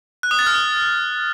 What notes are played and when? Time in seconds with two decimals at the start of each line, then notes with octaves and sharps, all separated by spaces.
0.23 F#6
0.31 D#6
0.39 A6
0.46 F6
0.54 D#6